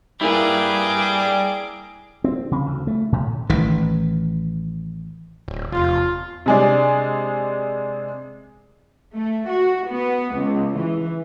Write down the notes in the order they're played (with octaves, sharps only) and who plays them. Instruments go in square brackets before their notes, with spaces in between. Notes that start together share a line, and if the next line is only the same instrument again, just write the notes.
[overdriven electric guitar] G3 B4 [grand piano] A#3 E4 [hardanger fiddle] G#4 D6
[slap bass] C4
C#3
D2
A3
A2
A1 D#3 E3
[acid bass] D1
[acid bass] F1 [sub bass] E2 [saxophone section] F4
[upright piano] C3 G#3 D4
[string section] A3
F#4
B3
C#2
E3